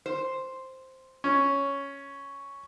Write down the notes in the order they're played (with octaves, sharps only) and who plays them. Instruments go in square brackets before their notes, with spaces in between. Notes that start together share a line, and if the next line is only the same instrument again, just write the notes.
[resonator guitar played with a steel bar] C5
[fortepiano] C#4